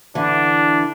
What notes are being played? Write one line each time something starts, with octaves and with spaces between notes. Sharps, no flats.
D3 E3 D4